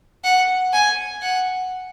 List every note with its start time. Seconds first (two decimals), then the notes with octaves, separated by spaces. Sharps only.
0.24 F#5
0.73 G#5
1.22 F#5